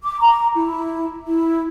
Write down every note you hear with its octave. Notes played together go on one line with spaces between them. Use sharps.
D6
A#5
E4
E4